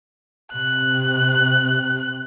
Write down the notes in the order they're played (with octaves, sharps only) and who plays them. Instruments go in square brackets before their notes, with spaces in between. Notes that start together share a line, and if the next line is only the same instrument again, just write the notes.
[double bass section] C3 [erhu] F#6